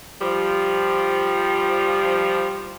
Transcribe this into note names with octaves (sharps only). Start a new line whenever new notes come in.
F3 G3